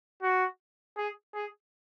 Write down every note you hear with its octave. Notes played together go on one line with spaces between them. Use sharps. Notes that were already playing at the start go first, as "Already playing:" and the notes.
F#4
G#4
G#4